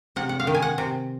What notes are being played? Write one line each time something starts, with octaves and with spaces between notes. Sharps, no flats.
C3 F#5
F#5
F5
D#3
G#5
F#5
C3